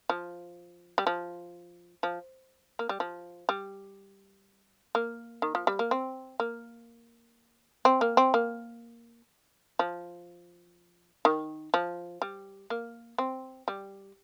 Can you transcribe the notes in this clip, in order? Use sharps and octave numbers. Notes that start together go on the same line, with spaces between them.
F3
G3
F3
F3
A#3
G3
F3
G3
A#3
D#3
F3
G3
A#3
C4
A#3
C4
A#3
C4
A#3
F3
D#3
F3
G3
A#3
C4
G3